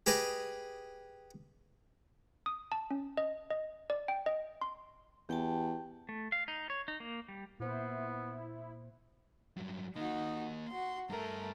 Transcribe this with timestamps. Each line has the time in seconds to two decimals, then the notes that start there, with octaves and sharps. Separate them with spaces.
0.06 G4 G#4 B4 D#5
2.46 D#6
2.72 A5
2.91 C#4
3.17 D#5
3.50 D#5
3.90 D5
4.08 G5
4.26 D#5
4.61 C6
5.29 E2 G4 G5 A5
6.09 A3
6.32 F5
6.48 D#4
6.70 C#5
6.88 D#4
7.00 A#3
7.29 G3
7.60 A#2 B3 E4 C5
9.56 G2 F#3
9.96 A#3 D#4 F#4 D#5
10.68 F#4 C6
11.10 G2 A3 A#4 A#5